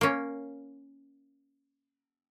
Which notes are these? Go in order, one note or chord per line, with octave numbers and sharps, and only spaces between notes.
A#3 C#4